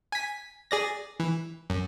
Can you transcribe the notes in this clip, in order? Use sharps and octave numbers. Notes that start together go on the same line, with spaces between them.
G#5 B6
G#4 D5 A#6
E3
F#2